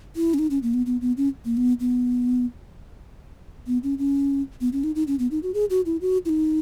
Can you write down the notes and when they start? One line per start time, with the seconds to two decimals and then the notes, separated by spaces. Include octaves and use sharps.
0.16 E4
0.34 C#4
0.39 D#4
0.50 C#4
0.63 A#3
0.74 B3
0.86 B3
1.01 B3
1.17 C#4
1.45 A#3
1.57 B3
1.80 B3
3.67 B3
3.83 C#4
3.98 C#4
4.61 B3
4.73 C#4
4.83 D#4
4.95 D#4
5.07 C#4
5.19 B3
5.31 D#4
5.43 F#4
5.54 G#4
5.70 F#4
5.86 E4
6.01 F#4
6.25 E4
6.29 D#4